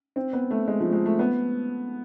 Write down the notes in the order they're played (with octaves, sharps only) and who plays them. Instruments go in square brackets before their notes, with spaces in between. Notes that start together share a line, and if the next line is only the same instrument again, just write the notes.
[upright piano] C4
B3
A3
G#3
F3
G#3
A3
B3